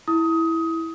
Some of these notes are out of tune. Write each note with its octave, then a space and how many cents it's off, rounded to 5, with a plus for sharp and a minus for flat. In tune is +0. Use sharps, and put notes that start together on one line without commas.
E4 -5 D#6 +20